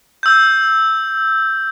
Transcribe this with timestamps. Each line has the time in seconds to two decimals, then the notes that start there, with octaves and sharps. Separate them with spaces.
0.23 E6 G6